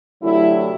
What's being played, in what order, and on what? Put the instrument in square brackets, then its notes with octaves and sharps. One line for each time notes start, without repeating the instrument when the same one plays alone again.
[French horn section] D2 C3 F#3 A3 E4